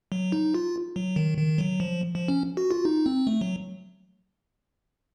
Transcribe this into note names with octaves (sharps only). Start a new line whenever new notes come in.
F#3
D#4
F4
F#3
D#3
D#3
F#3
F3
F3
C#4
F#4
F4
D#4
C4
A3
F#3